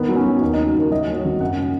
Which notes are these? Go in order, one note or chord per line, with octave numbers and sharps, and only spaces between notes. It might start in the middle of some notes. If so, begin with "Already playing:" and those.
Already playing: D#3 B3
F#3
C#4
F#3
D#2 D#4
D#4
C#3
F#4
D#2 A#4
F#3 D#5
F#3
C#5
G#1
F#2 F#5
C#3